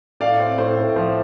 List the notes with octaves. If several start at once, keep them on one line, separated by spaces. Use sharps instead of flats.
A2 D5 F5
C4
A2 C5
A2
F3 C5